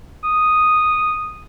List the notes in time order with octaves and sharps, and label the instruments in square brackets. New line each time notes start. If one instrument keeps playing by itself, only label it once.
[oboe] D#6